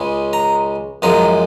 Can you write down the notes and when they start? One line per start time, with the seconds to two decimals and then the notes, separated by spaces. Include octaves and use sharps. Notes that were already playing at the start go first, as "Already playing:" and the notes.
Already playing: C#2 C#3 G#3
0.33 A#5
1.02 F#2 F3 G#3 A#5